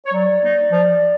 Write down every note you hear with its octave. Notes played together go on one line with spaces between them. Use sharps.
C#5
F#3 D5
A#3 D#4
F3